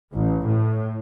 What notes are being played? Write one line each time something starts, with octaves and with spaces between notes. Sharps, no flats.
A1
A2